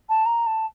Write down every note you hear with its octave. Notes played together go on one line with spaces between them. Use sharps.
A5
A#5
A5